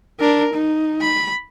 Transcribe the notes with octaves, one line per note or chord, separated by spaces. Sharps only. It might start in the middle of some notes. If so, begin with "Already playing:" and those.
D4 A#4
D#4
B5